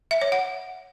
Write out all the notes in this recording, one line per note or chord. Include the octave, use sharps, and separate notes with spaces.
E5
C#5
F#5